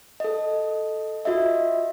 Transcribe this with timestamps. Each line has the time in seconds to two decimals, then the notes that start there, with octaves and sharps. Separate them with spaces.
0.20 A4 D#5
1.25 F4 F#4 D#5 E5